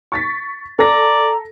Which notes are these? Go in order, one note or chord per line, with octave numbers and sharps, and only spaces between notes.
C#6 A6 B6
A4 D5 A#5 A#6